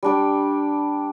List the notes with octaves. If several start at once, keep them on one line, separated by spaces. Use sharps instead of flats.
G3 D4 G4